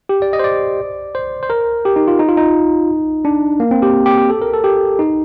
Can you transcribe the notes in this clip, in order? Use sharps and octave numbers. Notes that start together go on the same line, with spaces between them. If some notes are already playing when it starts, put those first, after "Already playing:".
G4
D5
D#5
C5
D5
C5
C5
A#4
G4
D#4
F4
D#4
F4
D#4
D4
A#3
C4
G4
G4
G4
A4
A#4
A4
G4
D#4